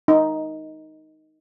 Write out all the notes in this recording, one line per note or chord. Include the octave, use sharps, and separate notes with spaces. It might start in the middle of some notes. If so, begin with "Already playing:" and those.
D#4